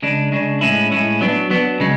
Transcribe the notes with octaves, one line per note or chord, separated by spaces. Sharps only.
C#3 G#3 D4
C#3 G#3 D4
A2 G#3 C#4 E4
A2 G#3 C#4 E4
F#3 B3 D4
F#3 B3 D4
C#3 G#3